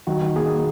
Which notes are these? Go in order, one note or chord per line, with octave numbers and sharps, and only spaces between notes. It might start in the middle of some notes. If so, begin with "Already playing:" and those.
D#3 F#4
D#3
A#3 G#4
A#3